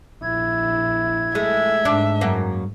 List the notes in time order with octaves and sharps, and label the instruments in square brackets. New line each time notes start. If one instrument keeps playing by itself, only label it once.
[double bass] A#1 E4 [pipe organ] G#6
[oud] G#3 A3 [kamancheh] E5
[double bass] G#2 [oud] D4
[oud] F#2 A#3